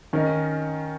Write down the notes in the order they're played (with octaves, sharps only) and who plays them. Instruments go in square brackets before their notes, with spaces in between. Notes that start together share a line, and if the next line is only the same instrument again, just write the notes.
[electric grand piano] D#3 [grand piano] C#4 A#4 D#5